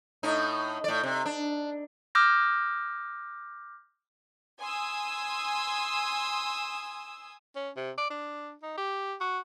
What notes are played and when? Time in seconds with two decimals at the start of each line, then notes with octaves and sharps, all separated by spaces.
0.23 A2 D#4
0.84 A2 D5
1.03 C3
1.26 D4
2.15 D6 E6 F6 G6 A#6
4.59 G#5 C6 D#6 E6
7.56 C#4
7.76 C3
7.98 D5
8.10 D4
8.62 D#4
8.77 G4
9.21 F#4